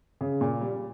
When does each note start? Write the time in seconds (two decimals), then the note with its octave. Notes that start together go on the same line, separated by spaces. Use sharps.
0.21 C#3
0.41 A#2
0.61 G3